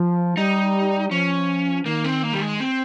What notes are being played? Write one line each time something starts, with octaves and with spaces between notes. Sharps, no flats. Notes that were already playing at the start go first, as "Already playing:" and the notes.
Already playing: F3
G3 D#4
F3 C#4
D#3 A#3
C4
A#3
G3
G#3
C4